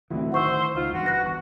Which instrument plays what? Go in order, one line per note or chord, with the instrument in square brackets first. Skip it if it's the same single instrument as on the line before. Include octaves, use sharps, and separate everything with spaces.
[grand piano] D1 D2 E4 [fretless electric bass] E3 C4
[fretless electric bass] D#3 [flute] C5 [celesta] F#5 C#6 E6
[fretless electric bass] C#2 [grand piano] D#4 [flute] F4
[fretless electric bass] E2 G2 [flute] F#4
[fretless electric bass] G1 [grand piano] B4 [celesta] F#6 A#6
[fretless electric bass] E2 [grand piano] C#6